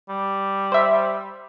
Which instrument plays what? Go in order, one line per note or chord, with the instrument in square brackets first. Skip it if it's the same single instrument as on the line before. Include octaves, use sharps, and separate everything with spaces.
[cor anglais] G3
[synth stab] C5 E5